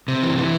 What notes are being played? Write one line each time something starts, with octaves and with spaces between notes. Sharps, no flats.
C3
E3
E3